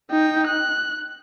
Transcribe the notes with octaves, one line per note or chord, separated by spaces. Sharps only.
D#4 G5
F#6